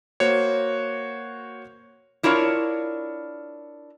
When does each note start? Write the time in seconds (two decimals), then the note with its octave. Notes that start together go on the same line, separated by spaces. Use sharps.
0.20 A#3 F#4 C5 C#5
2.23 D4 E4 F4 A#4 C#5